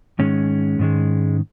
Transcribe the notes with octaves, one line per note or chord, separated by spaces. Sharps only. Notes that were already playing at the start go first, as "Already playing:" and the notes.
G#2 D#3 G#3 C#4
G#2 D#3 G#3